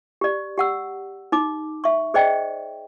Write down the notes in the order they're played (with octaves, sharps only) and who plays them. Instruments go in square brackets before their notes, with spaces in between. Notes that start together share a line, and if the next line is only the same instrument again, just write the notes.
[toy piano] G4 D5
G4 F#5 E6
D#4 D6
E5 C#6
G#4 C5 D5 D#5 G5